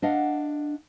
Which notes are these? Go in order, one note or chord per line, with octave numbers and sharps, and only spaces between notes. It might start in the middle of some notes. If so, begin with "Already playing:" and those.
D4 D#5 F5 F#5